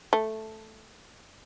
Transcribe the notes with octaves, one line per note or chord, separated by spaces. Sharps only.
A3